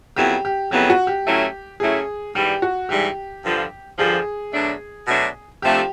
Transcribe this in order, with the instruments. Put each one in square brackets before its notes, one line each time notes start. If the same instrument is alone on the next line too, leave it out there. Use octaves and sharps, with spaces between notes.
[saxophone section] F2 C#3 F#3 B3 E4 [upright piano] G4
[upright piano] G4
[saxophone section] F2 C#3 F#3 B3 E4 [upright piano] G4
[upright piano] F#4
G4
[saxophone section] A2 F#3 A3 C#4 E4
[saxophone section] A2 F#3 A3 C#4 E4 [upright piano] G#4
[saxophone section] G#2 E3 G3 [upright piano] G4
[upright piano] F#4
[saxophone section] G#2 E3 G3 [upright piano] G4
[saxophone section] G2 D3 F3
[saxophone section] G2 D3 F3 [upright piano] G#4
[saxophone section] B2 F#3 A3 D4
B2 F#3 A3 D4
[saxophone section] C3 F3 A3 D4 [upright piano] G4